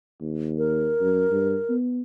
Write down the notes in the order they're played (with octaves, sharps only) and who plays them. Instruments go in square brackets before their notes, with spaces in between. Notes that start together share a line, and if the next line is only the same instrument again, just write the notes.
[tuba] D#2
[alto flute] A#4
[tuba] F#2
G2
B3